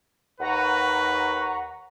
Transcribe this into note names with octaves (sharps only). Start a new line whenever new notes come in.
D#2 B4 F#5 A#5 C#6